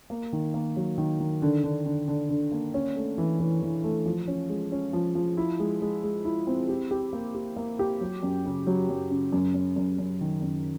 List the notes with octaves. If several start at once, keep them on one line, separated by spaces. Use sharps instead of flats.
A#3
D#3
A#3
F#3
D#3
D#3
D3
D3
D3
D3
D3
A#3
C#4
A3
E3
E3
E3
A3
F3
C#4
G#3
C#4
F3
F3
E4
G#3
G#3
G#3
E4
C4
G4
G4
A#3
G4
A#3
G4
F#3
F#2
C#3
F#3
F#2
C#3
F#2
F#2
F#2
F#2
D#3
F#2